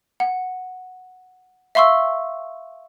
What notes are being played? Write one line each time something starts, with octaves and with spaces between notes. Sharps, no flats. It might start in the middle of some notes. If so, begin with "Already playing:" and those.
F#5
E5 F5 C6 C#6 E6